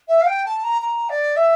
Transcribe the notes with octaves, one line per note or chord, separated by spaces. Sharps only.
E5
F5
G5
A5
A#5
A#5
D5
E5